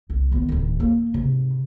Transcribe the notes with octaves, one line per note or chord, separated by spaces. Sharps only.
C2
D#3 B3
D1 D#3
A#3
G#2 C3